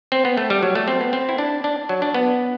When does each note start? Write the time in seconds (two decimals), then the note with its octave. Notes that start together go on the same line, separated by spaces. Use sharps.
0.12 C4
0.25 B3
0.37 A3
0.50 G3
0.63 F#3
0.75 A3
0.88 C4
1.01 B3
1.13 C4
1.29 E4
1.38 D4
1.64 D4
1.89 F#3
2.02 D4
2.14 B3